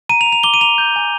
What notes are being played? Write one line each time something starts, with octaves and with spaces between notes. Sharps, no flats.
A#5 D#7
F7
A#5
F7
D6 G7
D#7
A#5 F7
G6
G#5